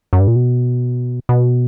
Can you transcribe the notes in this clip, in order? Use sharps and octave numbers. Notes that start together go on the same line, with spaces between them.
F#2
G2
A#2
B2
B2